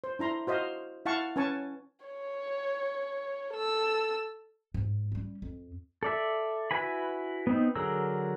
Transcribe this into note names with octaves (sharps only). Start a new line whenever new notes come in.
C5
D4 E4 A#5 C6
F#4 C5 D#5 F5
E4 F5 F#5 A5 C#6
C#4 B4 G#5 A5 C#6
C#5
A4 E6
G#2
G3 C#4
F2
A4 D5 E5
E4 F#4 B4 G#5 B5
B3 C4 D#4
D3 F#3 G#4 A#4 E6